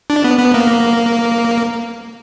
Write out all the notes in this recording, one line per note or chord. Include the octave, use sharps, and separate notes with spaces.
D4
B3
B3
A#3